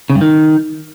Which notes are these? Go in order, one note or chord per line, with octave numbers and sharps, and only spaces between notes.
C#3
G2
D#3